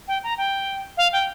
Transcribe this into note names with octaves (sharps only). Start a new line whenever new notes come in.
G5
A#5
G5
F5
G5